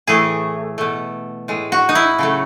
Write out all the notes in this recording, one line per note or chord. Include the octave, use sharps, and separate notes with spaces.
A2 E3 A3 G#4
B2 A3
A2 G#3
F#4
D#4
E4
C#3 F#3 A3